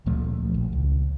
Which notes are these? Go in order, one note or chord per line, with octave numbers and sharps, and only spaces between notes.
D2 A#2 F3 A3
A#1
C#2